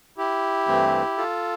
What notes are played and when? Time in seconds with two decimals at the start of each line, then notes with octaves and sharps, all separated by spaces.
0.18 E4 G4
0.67 G2 E3 A3 C4
1.17 F4 A4